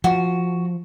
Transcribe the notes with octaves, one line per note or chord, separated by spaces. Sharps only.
F3 F#4